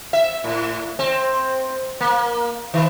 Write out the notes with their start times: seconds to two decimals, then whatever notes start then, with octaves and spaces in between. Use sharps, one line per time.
0.13 E5
0.44 A2
0.99 C4
2.01 A#3
2.74 D#3